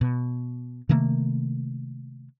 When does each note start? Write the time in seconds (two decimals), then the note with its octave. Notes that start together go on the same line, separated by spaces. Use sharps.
0.01 B2
0.89 C3 D#3 A3 A#3